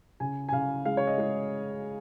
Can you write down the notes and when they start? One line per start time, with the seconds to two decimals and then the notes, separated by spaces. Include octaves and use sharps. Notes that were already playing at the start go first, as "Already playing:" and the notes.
0.20 C#3 G#5
0.49 G#5
0.52 C#3 F5
0.85 G#3 F5
0.97 C#5
1.07 D#5
1.18 G#3 G#4